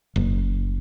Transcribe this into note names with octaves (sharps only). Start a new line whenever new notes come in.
F#1